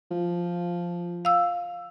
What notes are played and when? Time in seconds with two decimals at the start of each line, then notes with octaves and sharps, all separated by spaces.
0.11 F3
1.25 F5 E6